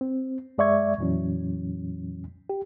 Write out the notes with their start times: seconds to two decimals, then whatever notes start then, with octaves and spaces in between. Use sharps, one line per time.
0.01 C4
0.58 F#2 G#3 D5 E5 C#6 G#6
0.98 F2 A#2 E3 F#3 C#4
2.50 G4